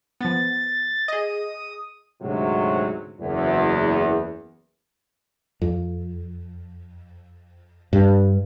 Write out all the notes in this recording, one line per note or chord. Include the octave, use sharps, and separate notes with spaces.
F3 B3 A6
G#4 D#5 D#6
D2 G#2 C3 F#3
F#1 E2
F2
G2